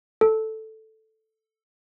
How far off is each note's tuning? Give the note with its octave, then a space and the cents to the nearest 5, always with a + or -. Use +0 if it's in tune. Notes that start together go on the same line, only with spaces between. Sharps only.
A4 +0